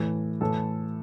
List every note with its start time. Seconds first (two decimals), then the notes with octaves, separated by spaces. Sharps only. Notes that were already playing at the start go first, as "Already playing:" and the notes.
Already playing: A2 E3
0.41 A2 E3 A4